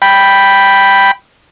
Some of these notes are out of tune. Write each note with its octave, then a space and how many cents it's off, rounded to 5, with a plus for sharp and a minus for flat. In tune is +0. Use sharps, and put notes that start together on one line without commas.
G5 +0 B5 +0